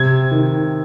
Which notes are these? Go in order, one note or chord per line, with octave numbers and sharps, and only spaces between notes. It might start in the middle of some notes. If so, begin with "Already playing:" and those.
Already playing: C3 G#6
D#3